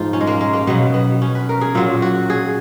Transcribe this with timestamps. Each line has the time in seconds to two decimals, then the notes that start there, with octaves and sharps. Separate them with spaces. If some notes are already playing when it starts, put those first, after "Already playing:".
Already playing: G#2 F3 D#4 F4
0.13 C#4
0.21 G#3
0.27 A#3
0.41 G#3
0.53 A#3
0.67 B2 F#3 B3
0.94 B3
1.22 C#4
1.35 B4
1.49 A#4
1.61 G#4
1.75 A#2 F#3 F4
2.02 F#4
2.30 G#4